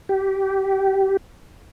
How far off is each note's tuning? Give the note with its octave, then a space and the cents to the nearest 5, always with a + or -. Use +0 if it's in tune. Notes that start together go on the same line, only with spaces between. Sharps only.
G4 -20